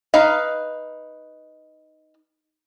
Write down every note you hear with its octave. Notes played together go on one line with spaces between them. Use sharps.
D#4 B4 F5